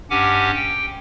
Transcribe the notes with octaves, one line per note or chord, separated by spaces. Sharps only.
G2 C#4 G4 F#5 G#5 D6
G5